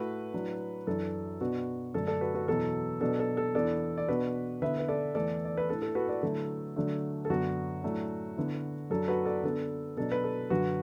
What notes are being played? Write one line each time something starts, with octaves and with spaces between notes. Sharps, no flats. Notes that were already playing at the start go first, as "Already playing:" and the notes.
Already playing: A2 A3 E4 F#4 B4
A2 F#3 D4
F#2 E3 D4 A4
B2 B3 D4 F#4
F#2 D3 A3 D4 A4
A4 D5
F#4 B4
F#4 B4
E2 B2 F#3 A4
B2 F#3 D4 A4
A4
A4
E2 E3 B3 D4 A4 D5
D5
B2 B3 D4 F#4 B4
D3 B3 E4 B4 E5
B4
A4 D5
E2 E3 A3 A4 D5
D5
B4
A2 E3 A3 D4 A4
A4
F#4 B4
A4 D5
D3 F#3 A3 E4 A4
D3 F#3 A3 D4
A4
F#2 D3 B3 D4 F#4
A2 F#3 A3 D4
D3 B3 E4
F#2 F#3 D4 A4
F#4 B4
A4 D5
D3 B3 D4 A4
B2 F#3 D4 A4
B4
A4
F#2 D3 F#3 F#4 B4